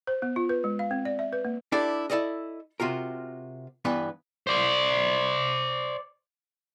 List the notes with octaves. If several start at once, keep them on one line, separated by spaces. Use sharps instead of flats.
C5
B3
F4
B4
G#3
F5
C4
D5
E5
B4
A#3
D4 E4 G4 A4 D5
E4 A4 D5 D#5
C3 F4 F#4 A#4
G2 E3 B3 B4
C5 D5